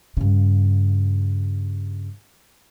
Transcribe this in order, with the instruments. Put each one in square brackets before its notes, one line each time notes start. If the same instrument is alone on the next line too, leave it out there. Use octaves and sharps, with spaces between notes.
[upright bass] G2 C#3